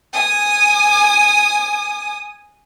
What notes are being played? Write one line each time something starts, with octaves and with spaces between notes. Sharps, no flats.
G#5 D#6